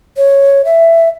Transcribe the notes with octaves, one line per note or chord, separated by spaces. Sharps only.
C#5
E5